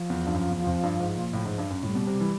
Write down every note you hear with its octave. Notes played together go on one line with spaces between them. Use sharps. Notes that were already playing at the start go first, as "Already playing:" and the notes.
Already playing: F3
E2
G2
F#2
E2
F2
G2
G#2
A#2
A2
G#2
G2
F#2
A2 G3
B2
C3
E3